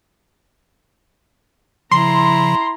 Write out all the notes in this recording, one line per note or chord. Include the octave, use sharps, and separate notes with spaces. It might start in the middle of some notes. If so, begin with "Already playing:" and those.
C#3 F3 E4 A#5 C6